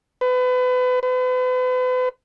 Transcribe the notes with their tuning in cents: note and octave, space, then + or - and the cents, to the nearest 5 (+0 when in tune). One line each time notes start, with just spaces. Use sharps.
B4 +30
B4 +40